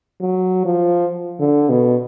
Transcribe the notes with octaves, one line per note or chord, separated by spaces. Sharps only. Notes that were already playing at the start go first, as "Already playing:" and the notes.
F#3
F3
D3
B2